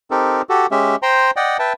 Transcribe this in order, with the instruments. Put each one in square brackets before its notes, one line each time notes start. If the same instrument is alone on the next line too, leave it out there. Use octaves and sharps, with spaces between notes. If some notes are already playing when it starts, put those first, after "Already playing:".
[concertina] C4 D#4 G4 A4 A#4
F#4 G4 A4
G#3 C#4 G4 E5
C5 G5 A#5 C6
D5 D#5 F#5 G5
B4 E5 G5 A5